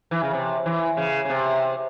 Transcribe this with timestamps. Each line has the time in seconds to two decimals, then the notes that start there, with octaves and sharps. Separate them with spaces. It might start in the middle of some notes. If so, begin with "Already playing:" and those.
0.11 E3
0.23 C#3
0.33 C3
0.66 E3
0.97 C#3
1.25 C#3
1.30 C3